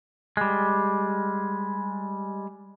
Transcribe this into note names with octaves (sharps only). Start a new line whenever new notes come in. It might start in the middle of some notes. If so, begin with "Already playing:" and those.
G3 G#3